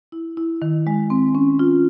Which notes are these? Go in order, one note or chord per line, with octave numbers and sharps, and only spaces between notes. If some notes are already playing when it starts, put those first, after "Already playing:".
E4
E4
D#3
G#3
C4
C#4
F4